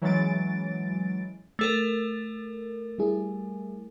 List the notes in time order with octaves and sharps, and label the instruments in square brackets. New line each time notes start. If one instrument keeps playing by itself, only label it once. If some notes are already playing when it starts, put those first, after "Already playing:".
[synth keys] E3 F#3 G#3 C#4 A6 D7
[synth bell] A3 A4 A#4
[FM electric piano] G3 E4 G#4